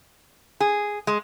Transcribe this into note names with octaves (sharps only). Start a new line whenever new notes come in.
G#4
G#3